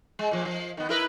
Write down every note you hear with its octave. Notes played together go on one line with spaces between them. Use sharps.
G#3
A#2 F3
F3
D#3 B3
E4 A#4 B4